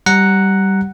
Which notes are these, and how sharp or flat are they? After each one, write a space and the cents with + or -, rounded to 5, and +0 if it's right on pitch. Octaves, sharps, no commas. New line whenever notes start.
G3 -10 F#5 +0 A#5 +0